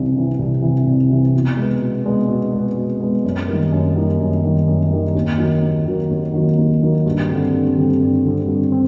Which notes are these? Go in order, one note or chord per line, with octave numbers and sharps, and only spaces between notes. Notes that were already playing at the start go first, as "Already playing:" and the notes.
Already playing: C2 C3 E3
C3 E3
C2
C3 E3
C2
C3 E3
B2
G#3
B3
B2
G#3 B3
B2
G#3 B3
B2
G#3 B3
F#2
D#3 G3 A#3
F#2
D#3 G3 A#3
F#2
D#3 G3 A#3
F#2
D#3 G3 A#3
D#2
D#3 F#3 A#3
D#2
D#3 F#3 A#3
D#2
D#3 F#3 A#3
D#2
D#3 F#3 A#3
G2
D3 G3 C4
G2
D3 G3 C4
G2
D3 G3 C4
G2
C4